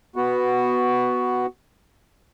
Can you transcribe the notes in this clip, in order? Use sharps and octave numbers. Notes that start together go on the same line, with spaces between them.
B3 F#4